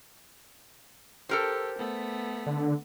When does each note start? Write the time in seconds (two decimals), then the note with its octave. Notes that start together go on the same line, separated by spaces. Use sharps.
1.29 G4 A4 A#4 C5
1.78 A3 B3
2.46 D3